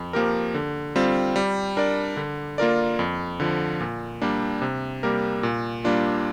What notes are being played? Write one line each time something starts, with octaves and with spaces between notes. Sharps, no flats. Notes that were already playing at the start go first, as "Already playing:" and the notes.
Already playing: F2
F3 A#3 G4 A#4
D3
G3 C4 F4
G3
D4 A#4 D5
D3
A#3 F4 A#4 D5
F2
D3 F3
A#2
G3 A#3 D4
C3
G3 A#3 G4 A#4
A#2
G3 A#3 D4 F4